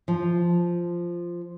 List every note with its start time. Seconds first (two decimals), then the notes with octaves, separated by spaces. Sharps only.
0.08 F3